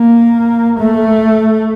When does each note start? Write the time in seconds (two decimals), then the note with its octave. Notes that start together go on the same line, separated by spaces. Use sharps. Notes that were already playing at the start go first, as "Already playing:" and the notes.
Already playing: A#3
0.79 A3